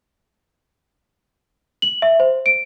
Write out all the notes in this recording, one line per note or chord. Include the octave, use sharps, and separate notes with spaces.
F#7
E5
C5
D7